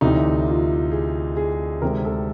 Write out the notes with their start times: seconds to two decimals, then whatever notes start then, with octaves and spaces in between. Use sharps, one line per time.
0.01 D2 C3 E3 D#4
0.47 F4
0.92 G#4
1.37 G#4
1.82 D2 C3 D#3 G#3 C4 A#4
2.05 A4